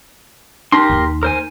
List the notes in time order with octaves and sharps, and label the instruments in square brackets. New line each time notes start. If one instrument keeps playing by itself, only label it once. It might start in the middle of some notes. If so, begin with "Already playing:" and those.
[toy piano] D#4 [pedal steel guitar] G4 A#4 C6
[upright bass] D#2
[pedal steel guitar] A#4 C5 G#5